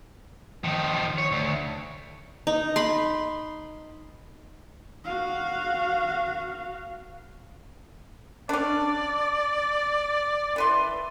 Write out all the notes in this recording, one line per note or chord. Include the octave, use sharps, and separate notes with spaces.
D#3 F3
C#5
D2
D#4
B5 C6
F#4 F5
C#4 D4 D5
E3 B4 C6